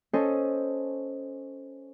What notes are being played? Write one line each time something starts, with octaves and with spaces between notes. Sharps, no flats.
C#4 A4 C5 D#5